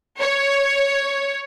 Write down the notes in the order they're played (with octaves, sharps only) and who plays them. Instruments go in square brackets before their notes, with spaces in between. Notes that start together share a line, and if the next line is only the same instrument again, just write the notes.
[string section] C#5